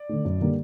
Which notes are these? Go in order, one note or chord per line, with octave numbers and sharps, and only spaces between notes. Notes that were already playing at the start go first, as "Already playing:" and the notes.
Already playing: D5
D3 A3
F#2
D3 G3 A#3